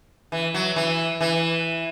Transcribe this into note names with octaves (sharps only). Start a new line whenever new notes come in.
E3
F#3
E3
E3